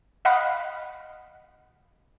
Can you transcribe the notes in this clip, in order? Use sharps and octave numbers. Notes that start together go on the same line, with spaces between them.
D#5 F5 F#5 B5